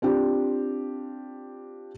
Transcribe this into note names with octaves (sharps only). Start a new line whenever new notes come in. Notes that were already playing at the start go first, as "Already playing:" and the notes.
C4 D4 F4 G4